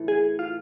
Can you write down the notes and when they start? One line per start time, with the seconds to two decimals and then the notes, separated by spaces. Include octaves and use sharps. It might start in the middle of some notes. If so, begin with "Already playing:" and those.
Already playing: A2 E3
0.08 G#4
0.39 F4